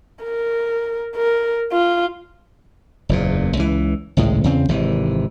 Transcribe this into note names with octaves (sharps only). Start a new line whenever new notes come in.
A#4
A#4
F4
F#1 E2 A#2
C#2 E3
G#1 C#2 A2 G#3
E2 C#3 C4
G#1 C3 E3